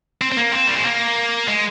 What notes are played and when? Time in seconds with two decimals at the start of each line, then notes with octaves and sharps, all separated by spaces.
0.21 C4
0.32 C4
0.37 A#3
0.52 C4
0.68 G3
0.76 G#3
0.85 A#3
1.48 G#3